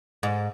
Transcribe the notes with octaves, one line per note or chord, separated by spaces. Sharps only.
G#2